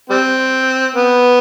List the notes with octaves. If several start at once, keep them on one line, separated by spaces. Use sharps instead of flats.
G3 C4
B3